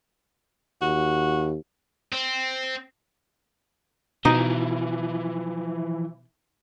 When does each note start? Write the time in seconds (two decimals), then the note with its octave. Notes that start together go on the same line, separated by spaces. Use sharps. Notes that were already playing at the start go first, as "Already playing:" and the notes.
0.82 D#2 F#4
2.13 C4
4.25 B2 E3 F3 D#4